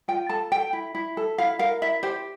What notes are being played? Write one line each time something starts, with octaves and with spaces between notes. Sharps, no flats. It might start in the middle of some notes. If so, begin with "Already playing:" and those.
F4 G5
A4 A5
A4 G5
E4
E4
A4
E4 F5
A#4 F5
E4 E5
G4 C5